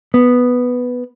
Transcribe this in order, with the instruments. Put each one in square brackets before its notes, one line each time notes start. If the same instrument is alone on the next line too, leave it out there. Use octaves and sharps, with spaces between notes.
[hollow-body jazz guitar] B3